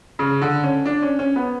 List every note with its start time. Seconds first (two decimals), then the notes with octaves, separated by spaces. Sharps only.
0.19 C#3
0.41 D3
0.63 C#4
0.86 D4
1.02 C#4
1.19 C#4
1.36 B3